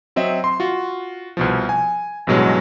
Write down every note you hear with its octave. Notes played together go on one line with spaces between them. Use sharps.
F#3 C4 D#5 E5
C6
F4 F#4
C2 B2 F3
G#5
A1 G2 B2 F#3 G#3